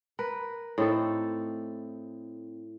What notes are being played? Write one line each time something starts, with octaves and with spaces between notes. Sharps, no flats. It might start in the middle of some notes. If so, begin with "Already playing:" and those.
A#4 B4
A2 C4 D#4 A4